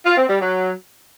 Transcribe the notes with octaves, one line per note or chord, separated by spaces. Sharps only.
F4
C4
G3
F#3